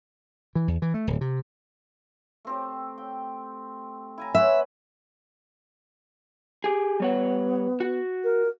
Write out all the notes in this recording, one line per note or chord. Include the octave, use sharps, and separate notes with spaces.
E3
E2
E3
A3
D1
C3
A3 C4 G4
G5
E4 G#5 A#5
B4 C#5 E5 F#5
G4 G#4
G3 B3 C#5 F#5
F#4
A#4